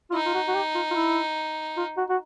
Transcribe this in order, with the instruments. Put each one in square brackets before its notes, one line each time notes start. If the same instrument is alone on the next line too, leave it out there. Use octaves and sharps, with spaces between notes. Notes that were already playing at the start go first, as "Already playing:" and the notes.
[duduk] F4
[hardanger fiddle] D#4 [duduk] E4
[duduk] F4
F#4
F#4
G4
F4
F4
E4
F4
F#4
F#4